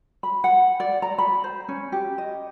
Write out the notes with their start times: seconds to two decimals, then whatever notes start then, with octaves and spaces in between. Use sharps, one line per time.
0.23 B5
0.44 F#5
0.80 D5
1.02 A#5
1.18 B5
1.44 C5
1.68 C#4
1.92 G4
2.18 D#5